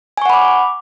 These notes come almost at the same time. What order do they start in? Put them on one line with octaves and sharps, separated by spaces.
G#5 C#6 F#5 B5 D6